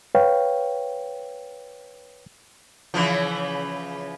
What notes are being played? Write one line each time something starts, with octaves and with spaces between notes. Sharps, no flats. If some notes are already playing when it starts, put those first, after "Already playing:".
B4 C#5 F5 G5
C#3 E3 F3